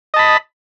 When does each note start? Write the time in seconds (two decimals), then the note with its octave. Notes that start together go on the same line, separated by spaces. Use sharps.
0.14 D#5
0.16 A5
0.19 B5